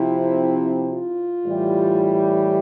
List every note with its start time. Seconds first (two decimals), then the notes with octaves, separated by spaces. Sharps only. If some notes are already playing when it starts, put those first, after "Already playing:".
Already playing: C3 F3 C4 E4
0.92 F4
1.46 A2 E3 G3